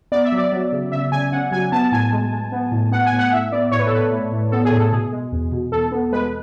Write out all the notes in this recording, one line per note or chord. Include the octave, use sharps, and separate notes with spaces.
B3 D5
E5
F#3
D5
F#3
C#3
C#3 E5
C#3 G#5
C#3 F#5
F#3 G#5
B3 A5
A2 G#5
G#3
G#3
B3
A2
B3 F#5
G#5
A2
F#5
A2 E5
B3 D5
A2 C#5
B4
A4
A2 B4
A2
A2
B3 A4
G#4
A2
A4
B2 G#4
G#3
E2
B2
E2 A4
B3
G#3 B4